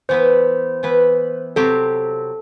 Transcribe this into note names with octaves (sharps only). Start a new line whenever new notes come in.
E3 B3 E4 B4 C5
E3 B3 E4 B4
C3 F#3 C4 G4 A4